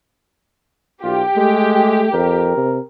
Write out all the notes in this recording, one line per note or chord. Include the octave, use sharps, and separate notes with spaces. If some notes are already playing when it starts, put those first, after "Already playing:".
B1 F4 G4
G#3 A3
F2 A#4
C3